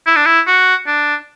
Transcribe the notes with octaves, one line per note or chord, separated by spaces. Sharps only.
E4
D4
E4
F#4
D4